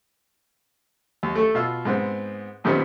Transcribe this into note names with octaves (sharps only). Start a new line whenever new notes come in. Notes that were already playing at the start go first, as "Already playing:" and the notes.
D#2
A3 A4
B2 F4 E6
G#2 B3 C4
F#2 A#2 D#3 G3 B3 C4